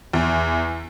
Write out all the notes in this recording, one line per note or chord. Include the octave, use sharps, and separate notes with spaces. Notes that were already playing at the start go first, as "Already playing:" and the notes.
E2